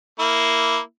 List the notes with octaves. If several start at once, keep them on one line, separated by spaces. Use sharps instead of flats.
A#3 E4